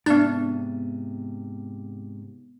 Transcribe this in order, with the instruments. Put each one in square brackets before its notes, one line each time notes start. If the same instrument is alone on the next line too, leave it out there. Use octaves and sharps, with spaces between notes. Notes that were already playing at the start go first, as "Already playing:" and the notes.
[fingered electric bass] G#2 C3 [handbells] B3 A6 [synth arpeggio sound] D4